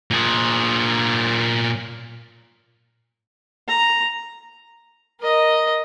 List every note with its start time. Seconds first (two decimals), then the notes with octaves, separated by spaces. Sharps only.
0.11 A#2 G#4
3.68 A#5
5.20 A#4 D#5